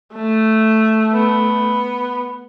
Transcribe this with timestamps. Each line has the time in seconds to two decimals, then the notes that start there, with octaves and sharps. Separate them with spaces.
0.15 A3
1.12 B3